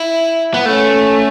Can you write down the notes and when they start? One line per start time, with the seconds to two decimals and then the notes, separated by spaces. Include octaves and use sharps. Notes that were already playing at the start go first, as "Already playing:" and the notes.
Already playing: E4
0.54 B3
0.66 A3 C#4